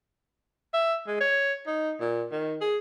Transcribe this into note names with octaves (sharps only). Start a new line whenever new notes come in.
E5
G#3
C#5
D#4
A#2
D#3
G#4